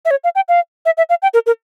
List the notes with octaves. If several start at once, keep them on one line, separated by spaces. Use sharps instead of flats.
E5
C#5
F5
G5
F5
E5
E5
F5
G5
A#4
A#4